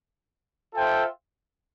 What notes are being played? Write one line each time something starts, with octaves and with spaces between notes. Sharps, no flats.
F4 A4 C5 E5 G5